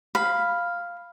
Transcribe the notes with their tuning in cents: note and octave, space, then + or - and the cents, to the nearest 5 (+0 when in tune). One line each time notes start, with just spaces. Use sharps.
F5 +0 B5 +0